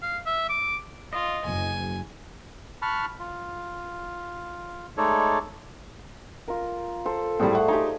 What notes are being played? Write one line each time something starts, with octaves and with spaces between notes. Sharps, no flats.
F5
E5
D6
F4 D#5
F#1 G#5
A5 B5 C#6 F6 F#6
F4
G#3 A3 D#4 A4 C#5 D5
F4 A#4
A4 C5
A2 G3 G#4 C5 D5
A3 F#5
D#4 G4 G#5